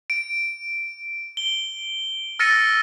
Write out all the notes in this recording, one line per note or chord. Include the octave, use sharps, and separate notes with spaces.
D7
G7
E6 F6 A6 A#6 C#7 D#7